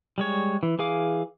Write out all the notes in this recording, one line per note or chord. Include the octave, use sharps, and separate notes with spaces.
G3 G#3 C#5
E3
E3 G#4 F5 D6